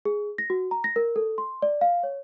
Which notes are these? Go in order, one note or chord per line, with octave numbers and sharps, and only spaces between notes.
G#4
A#6
F#4
A#5
A#6
A#4
A4
C6
D5
F5
C#5